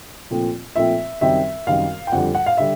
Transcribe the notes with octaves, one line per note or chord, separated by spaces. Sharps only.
A#2 F3 A3 C4
A#2 F3 A3 C4 E5
F#2 D#3 G3 C4 E5
F#2 D#3 G3 C4 F5
G5
F2 D3 G3 F#5
F#5
F5
D3 G3 E5